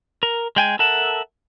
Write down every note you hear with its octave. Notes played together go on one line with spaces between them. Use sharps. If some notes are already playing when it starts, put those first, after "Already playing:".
A#4
G#3 G5 G#5
A4 A#4 E5 F#5 A5